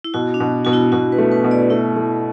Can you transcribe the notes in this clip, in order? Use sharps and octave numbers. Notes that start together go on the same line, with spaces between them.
E4
B2 F#4
D4
B2
B2 F#4
E4
B2 F#4
B4
A3
B4
B2
D5
A3 E4
A3